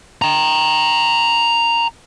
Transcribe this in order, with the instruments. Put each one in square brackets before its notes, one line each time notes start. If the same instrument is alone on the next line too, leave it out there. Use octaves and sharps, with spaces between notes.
[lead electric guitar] G5 A#5